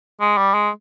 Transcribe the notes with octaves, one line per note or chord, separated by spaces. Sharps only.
G#3
G3
G#3